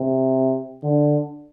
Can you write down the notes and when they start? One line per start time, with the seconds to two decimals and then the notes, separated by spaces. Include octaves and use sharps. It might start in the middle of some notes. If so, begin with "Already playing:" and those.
Already playing: C3
0.83 D3